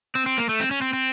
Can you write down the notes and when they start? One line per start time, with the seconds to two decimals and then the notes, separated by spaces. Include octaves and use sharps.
0.15 C4
0.26 C4
0.38 A#3
0.49 A3
0.60 C4
0.71 C#4
0.82 C4
0.93 C4